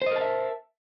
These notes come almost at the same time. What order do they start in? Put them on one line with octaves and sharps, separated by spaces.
C5 D#5 A#4 A5 E5